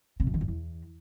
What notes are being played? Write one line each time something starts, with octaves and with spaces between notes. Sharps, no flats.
C3
F2
D#3
F2
E2